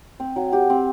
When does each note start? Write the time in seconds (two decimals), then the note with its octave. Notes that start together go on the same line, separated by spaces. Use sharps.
0.20 C4
0.36 F#3
0.53 G4
0.70 C4